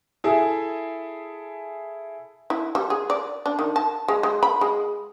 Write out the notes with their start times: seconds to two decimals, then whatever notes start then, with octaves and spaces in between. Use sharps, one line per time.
0.24 E4 G#4 A4 E5 G#5
2.50 E4
2.75 G3
2.90 G#4
3.10 D5
3.46 D4
3.59 D#3
3.76 A5
4.08 G#3
4.23 G#3
4.43 B5
4.61 G#3